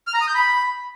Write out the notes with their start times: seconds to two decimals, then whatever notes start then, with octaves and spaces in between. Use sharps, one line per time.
0.07 F6
0.14 A#5
0.21 D#6
0.28 G6
0.35 B5